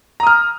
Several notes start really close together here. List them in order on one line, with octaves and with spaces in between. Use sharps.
A#5 D#6 F6